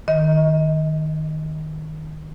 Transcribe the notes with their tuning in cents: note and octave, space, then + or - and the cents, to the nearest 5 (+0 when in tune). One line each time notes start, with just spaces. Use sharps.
D#3 -5 D#5 +30